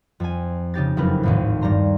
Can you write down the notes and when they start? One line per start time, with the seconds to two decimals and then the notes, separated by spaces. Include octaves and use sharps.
0.20 F2 G#5
0.74 C#3 D#4 G4 A6
0.97 F#1 F2 C#3 A3 A#4 B4
1.23 G#1 D#2 A2
1.61 G2 G3 A#5 C6